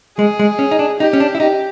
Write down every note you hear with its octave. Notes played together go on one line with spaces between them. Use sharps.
G#3 G#4
G#3
C#4
D#4
D4
D#4 G4
C#4
D4
E4
D#4 G4